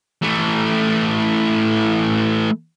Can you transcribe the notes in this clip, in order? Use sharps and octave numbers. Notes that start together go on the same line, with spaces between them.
E3 A3